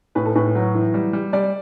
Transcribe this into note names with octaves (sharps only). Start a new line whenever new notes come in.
A2 B4
A4
A2 B4
F#3
E3
G3
G3
G3 D5